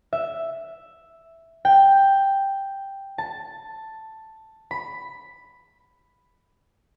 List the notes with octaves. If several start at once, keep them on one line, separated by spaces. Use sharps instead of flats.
E5
G5
A5
B5